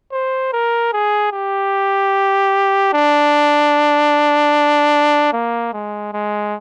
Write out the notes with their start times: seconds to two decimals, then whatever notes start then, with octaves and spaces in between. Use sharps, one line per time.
0.12 C5
0.53 A#4
0.93 G#4
1.33 G4
2.93 D4
5.33 A#3
5.73 G#3
6.13 G#3